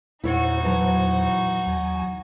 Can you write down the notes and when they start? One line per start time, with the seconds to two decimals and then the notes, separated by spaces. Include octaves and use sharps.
0.24 E2 A#2 D#4 E4 F#4 C5 C#5
0.63 E3 F#3 A5
1.66 D#2 F#3 G#5